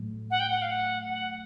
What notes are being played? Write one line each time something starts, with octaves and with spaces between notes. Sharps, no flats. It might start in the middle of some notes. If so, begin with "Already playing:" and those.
Already playing: A2 F#3 A3
F#5
G5
F#5
F5
F#5
F#5